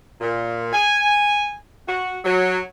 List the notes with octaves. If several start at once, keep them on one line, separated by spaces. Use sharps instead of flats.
A#2
G#5
F#4
F#3